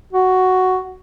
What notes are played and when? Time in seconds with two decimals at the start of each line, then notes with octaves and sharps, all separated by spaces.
0.13 F#4